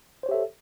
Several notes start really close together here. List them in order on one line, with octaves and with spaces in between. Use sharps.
C5 C#5 G4 E5 A4